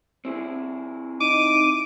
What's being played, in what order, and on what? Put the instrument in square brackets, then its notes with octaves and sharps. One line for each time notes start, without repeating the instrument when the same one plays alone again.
[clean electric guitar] C4 E4 G#4
[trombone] D#4 [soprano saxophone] D6 [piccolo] D#7